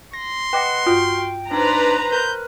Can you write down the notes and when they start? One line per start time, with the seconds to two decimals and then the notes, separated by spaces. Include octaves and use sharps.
0.13 C6 A#6
0.53 B4 D#5 F#5 G5 D6 A#6
0.86 G2 F4 F#4 G5 F6
1.18 G5
1.51 D4 D#4 B4 C5 D5 A#5
2.12 A#4 F#6 G6